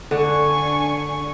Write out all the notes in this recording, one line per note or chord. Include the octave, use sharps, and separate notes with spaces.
D3 D4 G#5 C#6